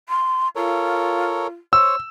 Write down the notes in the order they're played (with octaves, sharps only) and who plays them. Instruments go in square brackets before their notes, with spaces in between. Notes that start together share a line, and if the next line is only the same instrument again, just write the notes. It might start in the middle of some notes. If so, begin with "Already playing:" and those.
[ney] C6
[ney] F4 [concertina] A4 A#4 C#5
[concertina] C5 C#5 [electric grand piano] E6